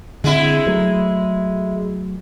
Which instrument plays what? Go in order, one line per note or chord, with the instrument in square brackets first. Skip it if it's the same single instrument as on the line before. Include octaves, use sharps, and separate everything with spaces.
[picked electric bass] D3 C4 [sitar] G#3 E4
[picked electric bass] F#3 A3